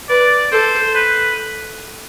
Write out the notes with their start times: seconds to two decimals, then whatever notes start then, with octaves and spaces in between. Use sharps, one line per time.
0.09 B4 D5
0.51 A4 C5
0.94 B4